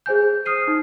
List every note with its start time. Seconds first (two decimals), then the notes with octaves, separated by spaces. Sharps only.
0.06 G#4 C5 G#5 G6
0.46 D#6 F6 C7 D#7
0.68 D#4